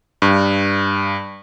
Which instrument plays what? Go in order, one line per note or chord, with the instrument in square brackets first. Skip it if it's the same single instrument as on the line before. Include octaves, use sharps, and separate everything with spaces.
[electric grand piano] G2